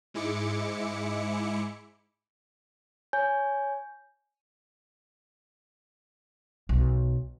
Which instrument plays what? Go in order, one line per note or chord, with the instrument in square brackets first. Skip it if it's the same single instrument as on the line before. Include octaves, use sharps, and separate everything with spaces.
[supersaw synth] G#2 G#3 E4 D6 C#7
[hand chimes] C#5 G#5 G6
[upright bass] B1